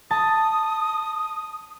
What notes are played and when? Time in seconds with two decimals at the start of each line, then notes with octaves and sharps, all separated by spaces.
0.11 A5 D#6